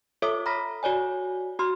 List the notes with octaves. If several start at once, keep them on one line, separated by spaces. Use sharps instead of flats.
F4 A4 C#5 E5 D6 D#6
A#5 B5 F6 A#6 B6
F#4 C#5 D5 G#5
F#4 C6 F6